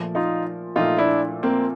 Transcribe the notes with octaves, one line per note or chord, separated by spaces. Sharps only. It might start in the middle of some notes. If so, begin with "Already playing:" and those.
Already playing: A#2 F3 A3
D#4 F4
A#2 F3 A3 D#4 F4
D4 E4
A#3 C4